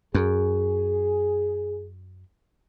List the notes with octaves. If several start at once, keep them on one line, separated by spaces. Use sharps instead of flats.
F#2 G#4